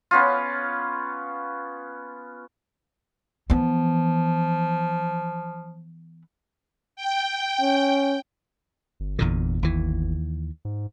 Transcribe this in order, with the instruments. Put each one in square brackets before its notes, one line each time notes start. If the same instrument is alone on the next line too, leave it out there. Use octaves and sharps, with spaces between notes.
[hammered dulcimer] B3 C#4 F4
[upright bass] E3 B3 [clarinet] F3
[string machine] G5
[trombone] C#4
[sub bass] G1
[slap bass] E2 A#2 D3
D#2 E3
[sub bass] G#2